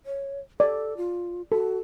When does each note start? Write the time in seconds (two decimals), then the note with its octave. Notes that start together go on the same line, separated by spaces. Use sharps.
0.06 C#5
0.60 A4 D5
0.97 F4
1.52 F#4 A4